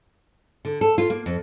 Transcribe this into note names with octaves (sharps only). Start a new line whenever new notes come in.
D3
A4
F4
A#3
F2